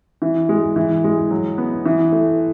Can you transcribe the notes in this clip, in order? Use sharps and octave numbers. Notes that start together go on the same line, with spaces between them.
E3
G#3
E3
G#3
F#3
B3
E3
A3